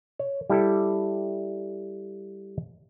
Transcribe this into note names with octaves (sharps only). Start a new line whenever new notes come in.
C#5
G3 E4 G4 A4